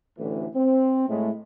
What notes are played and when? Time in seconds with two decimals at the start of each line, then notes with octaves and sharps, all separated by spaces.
0.18 A1 D2 A2 D3 E3
0.56 C4
1.09 A2 G#3 A3